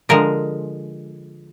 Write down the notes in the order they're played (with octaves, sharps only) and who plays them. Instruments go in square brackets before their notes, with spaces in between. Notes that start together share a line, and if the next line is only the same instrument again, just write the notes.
[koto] D3 F3 G#3 A#4